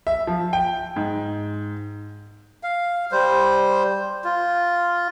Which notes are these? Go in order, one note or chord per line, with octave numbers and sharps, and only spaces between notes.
E5
F3
G5
G#2
F5
G3 C5
F4